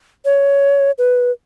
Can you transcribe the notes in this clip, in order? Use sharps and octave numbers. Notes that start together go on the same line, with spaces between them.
C#5
B4